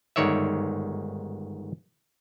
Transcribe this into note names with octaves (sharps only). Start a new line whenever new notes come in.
G1 G#2 D#3 C#5 D5 E5